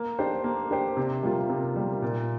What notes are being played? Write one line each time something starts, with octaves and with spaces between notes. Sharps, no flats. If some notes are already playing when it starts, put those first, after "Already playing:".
Already playing: A#3
D4 G4 C5
A#3
D4 G4 C5
C3
G3 A#3 F4
C3
G3 A#3 F4
A#2